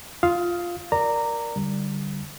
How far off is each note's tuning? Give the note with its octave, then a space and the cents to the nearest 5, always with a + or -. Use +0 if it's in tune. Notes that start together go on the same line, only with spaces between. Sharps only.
F4 +0 F5 +0 D#6 +25
A#4 +10 D5 +0 A#5 -15
D3 +0 G3 +0